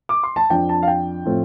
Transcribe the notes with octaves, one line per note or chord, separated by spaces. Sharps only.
D6
C6
A5
F2 F3 D4 G5
A5
F5
G5
A2 F3 A3 C4 F4